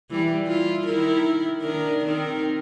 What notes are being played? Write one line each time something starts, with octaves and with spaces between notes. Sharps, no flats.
E3 G3
E4 F4
D#3 E4 A#4
D#3 D4 A#4
D#3 C4 A#4